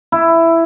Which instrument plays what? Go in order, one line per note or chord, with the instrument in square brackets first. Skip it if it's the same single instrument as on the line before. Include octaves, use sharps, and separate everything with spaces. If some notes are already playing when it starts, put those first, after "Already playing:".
[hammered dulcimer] E4